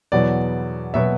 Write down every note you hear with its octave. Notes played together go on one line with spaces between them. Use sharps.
E2 B2 F#3 B3 D5
B2 F#3 B3 E5